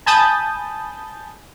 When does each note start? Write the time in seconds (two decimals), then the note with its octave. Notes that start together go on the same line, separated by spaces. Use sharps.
0.06 G#5 A5 B5 D#6 G6 A6